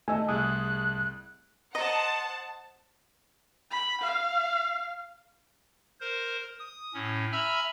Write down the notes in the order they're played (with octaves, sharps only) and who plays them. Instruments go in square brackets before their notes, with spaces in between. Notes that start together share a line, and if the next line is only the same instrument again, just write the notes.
[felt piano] A3 D#5 [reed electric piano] G#5 E6
[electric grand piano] C2 G#4 [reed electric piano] D#6 [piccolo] F#6
[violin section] C5 F#5 A5 [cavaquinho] D#5 A#5
[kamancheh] B5
F5
[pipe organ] A#4 C5
D#6
A2 C#4
E5 G#5 A#5 B5 E6 F6